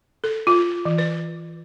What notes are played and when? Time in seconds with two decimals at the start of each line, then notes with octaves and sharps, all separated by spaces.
0.24 A4
0.47 F4
0.85 E3
0.98 B4